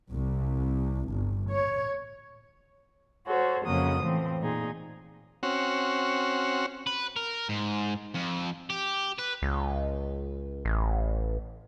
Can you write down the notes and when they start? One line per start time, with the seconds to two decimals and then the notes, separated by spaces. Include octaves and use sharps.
0.11 C2
1.09 G1
1.50 C#5
3.27 F#4 A4 C5 C#5
3.65 F2 C#3 F#3 A#3 D#6
4.02 A2 E3 F3 C4
4.41 A#2 D#4 G#4
5.43 C4 C#4 F#4
6.87 B4
7.16 A#4
7.49 G#2
8.14 F2
8.70 G4
9.18 B4
9.42 C#2
10.65 A1